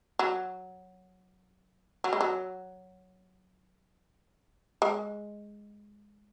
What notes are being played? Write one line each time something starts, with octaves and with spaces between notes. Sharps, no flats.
F#3
F#3
G#3
F#3
G#3